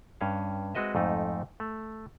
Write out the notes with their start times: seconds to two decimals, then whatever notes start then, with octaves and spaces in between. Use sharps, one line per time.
0.21 G2 C#4 F5
0.75 G#3 C4 F#4 B4 D#5 E5
0.95 F2 G#2 A3 D#4
1.60 A3